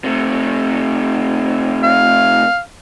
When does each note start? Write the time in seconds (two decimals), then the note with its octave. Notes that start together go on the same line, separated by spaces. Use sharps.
0.04 C3 A3
1.83 F5